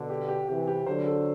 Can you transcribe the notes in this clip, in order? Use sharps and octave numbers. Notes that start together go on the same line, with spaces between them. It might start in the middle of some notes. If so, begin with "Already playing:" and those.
Already playing: B2 D3
G4
G4
C3 E3 G4
G4
D3 F#3 C5
A4